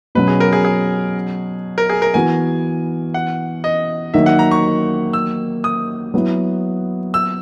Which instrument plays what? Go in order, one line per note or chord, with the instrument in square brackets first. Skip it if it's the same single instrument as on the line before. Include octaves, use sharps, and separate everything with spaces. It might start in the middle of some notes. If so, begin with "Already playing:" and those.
[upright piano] B2 F#3 C#4 [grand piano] B4
[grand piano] G#4
A#4
G#4
G#4
A#4
G#4
A#4
[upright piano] E3 B3 F#4 [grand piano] G#5
[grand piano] F#5
D#5
[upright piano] D#3 F#3 A#3 D#4 F#4 [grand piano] E5
[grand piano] F#5
A#5
C#6
E6
D#6
[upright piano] F#3 B3 E4
[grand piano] E6